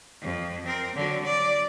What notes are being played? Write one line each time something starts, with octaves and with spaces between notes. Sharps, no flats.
F2
C4 A#4
D3 F#3
D5